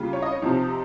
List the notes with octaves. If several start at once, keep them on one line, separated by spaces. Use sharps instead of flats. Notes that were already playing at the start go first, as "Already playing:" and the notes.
Already playing: C#3 G3 A#3 F4
C#5
D#5
C#5
C3 F3 C4 D#4